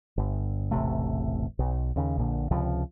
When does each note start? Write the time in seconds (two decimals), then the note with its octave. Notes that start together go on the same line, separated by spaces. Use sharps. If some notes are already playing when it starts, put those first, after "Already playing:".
0.18 G1
0.71 E1 A1 C3 A3
1.59 B1
1.96 D#2 C#3
2.18 A#1 A#2 D3
2.51 C#2 C3 F3